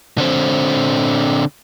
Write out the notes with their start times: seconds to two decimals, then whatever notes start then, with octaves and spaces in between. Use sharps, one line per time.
0.18 D3 C4